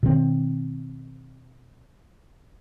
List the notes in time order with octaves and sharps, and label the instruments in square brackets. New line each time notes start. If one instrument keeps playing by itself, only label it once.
[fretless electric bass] B2 D#3 C4